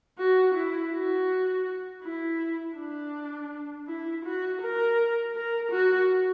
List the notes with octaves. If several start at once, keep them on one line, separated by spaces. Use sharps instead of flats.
F#4
E4
F#4
E4
D4
E4
F#4
A#4
A#4
F#4